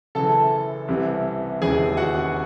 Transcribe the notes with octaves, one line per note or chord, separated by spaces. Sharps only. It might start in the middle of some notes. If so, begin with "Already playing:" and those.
F#1 F#2 C#3 E3 A4 A5
C2 C3 E3
E1 D#2 C#3 E3 G#4 G#5
F#4 F#5